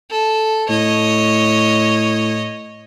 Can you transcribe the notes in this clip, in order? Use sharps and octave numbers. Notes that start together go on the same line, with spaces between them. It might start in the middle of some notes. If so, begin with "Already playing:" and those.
A4
A2 C#5 D#5